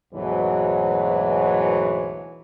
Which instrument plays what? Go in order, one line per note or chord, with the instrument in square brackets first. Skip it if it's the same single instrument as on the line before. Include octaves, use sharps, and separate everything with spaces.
[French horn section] D2 G#2 B2 E3 F#3 C#5